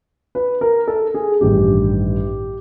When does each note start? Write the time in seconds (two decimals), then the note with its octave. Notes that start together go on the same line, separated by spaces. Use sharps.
0.35 B4
0.61 A#4
0.88 A4
1.14 G#4
1.41 A1 G2 D#3 G4